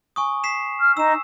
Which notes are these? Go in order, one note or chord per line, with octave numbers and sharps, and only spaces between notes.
G#5 C#6 D#6
B6 C7 E7
F6
D#4 E6 E7